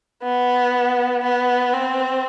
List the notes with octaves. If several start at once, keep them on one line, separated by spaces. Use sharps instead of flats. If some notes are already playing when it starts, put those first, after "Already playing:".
B3
B3
C4